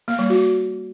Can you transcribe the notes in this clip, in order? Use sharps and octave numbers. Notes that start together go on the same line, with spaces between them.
A#3
G3
F#4